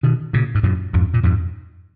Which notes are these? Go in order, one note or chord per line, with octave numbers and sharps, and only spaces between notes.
B2 D#3
A#2 C#3
G#2
F#2 A#2
F2 G#2
A#2
F2 G#2